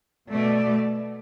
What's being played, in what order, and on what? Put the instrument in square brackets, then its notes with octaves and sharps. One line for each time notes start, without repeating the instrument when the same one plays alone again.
[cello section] B2 A3 D5